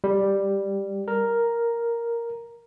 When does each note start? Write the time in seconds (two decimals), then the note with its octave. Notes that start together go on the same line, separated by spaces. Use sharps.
0.04 G3
1.08 A#4